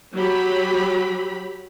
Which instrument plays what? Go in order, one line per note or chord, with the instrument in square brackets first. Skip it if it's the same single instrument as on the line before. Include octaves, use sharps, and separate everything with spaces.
[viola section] F#3 G4 B5